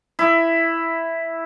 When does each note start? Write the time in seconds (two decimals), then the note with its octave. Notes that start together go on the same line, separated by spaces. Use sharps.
0.19 E4